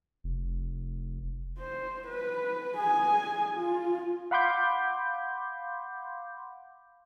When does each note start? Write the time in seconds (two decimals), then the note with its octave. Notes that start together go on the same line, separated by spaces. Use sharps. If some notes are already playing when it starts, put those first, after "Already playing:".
0.24 F1
1.59 C5
2.07 B4
2.78 G#4 G#5
3.55 F4
4.31 F5 F#5 B5 C6 D6 G6